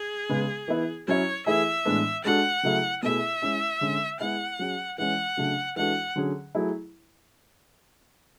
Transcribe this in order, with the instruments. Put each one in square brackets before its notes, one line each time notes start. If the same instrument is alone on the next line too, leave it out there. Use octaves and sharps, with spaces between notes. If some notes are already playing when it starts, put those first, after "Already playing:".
Already playing: [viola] G#4
[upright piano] C#3 G#3 B3
E3 B3 E4
[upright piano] F#3 C#4 E4 [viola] C#5
[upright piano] E3 A3 E4 G#4 [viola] E5
[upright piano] A2 E3 G#3 B3 D4
[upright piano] G#3 D4 F#4 A4 [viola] F#5
[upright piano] C#3 F#3 A3 E4 G#4
[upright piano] B2 A3 E4 G#4 [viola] E5
[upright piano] G#3 C#4 E4
D3 G#3 C#4
[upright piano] G#3 B3 E4 G#4 [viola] F#5
[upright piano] F#3 C#4 G#4
[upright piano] E3 G#3 C#4 [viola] F#5
[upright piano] C#3 F#3 A3 D4
[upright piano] E3 G#3 D4 F#4 A4 [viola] F#5
[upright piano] D3 F#3 C#4 G#4
F#3 A3 E4 G#4